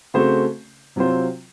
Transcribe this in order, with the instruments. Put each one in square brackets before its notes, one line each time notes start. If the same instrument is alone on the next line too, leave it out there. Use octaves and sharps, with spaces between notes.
[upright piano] C#3 A3 C4 F#4 C5
C3 F#3 C4 F4 C5